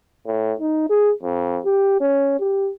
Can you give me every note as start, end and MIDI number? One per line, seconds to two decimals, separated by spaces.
0.27 0.53 45
0.60 0.89 63
0.90 1.11 68
1.23 1.60 41
1.65 2.01 67
2.01 2.35 61
2.39 2.70 67